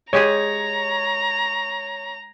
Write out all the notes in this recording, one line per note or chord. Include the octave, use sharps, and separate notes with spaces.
G#3 G4 G#4 C#5 A#5